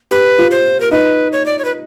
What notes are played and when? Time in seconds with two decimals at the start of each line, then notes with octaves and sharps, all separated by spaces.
0.11 G4 B4
0.38 F4
0.51 C5
0.80 A#4
0.91 D#4 B4
1.32 C#5
1.46 D5
1.59 C#5
1.65 B4